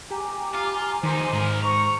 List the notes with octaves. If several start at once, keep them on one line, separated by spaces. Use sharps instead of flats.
G4 G#5 A#5 D6
F4
F2 D#3 D#4 C5
G#2 G#3 A#4
C5 A#5 C#6